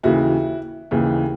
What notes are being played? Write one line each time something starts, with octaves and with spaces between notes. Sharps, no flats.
D#2 C#3 E3 E4 F#4
D#2 C#3 E3